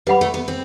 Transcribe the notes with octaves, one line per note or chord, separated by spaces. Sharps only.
G3 B4 F#5 B5
A3
B3
C4